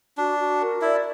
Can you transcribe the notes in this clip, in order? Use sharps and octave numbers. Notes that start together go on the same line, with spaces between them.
D4 F#4
F#4
A#4
E4 D5